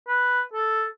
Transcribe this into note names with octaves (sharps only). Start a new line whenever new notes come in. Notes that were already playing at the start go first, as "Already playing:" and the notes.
B4
A4